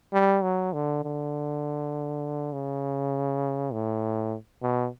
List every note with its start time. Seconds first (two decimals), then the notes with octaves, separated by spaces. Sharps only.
0.13 G3
0.43 F#3
0.73 D3
1.04 D3
2.52 C#3
3.73 A2
4.62 B2